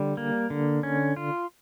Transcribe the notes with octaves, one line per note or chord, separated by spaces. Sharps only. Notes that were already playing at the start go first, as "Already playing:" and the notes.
Already playing: D3 G3
A#3
D3
C#4
F4